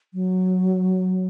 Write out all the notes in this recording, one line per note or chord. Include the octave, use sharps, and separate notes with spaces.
F#3